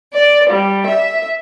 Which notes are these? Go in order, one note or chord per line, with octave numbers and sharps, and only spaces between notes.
D5
G3
E5